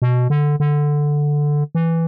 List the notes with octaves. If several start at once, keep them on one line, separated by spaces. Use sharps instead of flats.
B2
D3
D3
E3